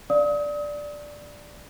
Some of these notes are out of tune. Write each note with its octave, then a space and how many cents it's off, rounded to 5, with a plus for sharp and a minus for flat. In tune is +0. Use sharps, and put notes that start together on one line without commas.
D5 +0 F5 -5 D#6 +35